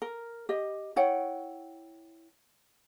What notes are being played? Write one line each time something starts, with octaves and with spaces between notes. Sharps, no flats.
A#4
G4 D#5
E4 C#5 F#5 G5